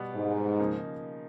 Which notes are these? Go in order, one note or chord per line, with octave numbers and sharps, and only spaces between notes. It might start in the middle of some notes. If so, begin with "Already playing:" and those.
Already playing: B2 G3 B3
G#2
C#3 F3 A#3 D#4